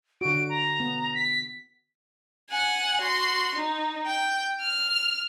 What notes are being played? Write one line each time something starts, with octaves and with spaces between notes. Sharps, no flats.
D3 F#4 D7
A#5
B3
B6
F#5 G#5
F#4 C6
D#4
G5
F6